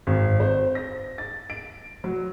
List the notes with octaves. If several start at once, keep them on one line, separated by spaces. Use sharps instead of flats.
G#1
C5
A#6
A6
D7
F#3